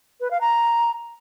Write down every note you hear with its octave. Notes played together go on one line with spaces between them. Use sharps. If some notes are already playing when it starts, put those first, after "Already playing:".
B4
F5
A#5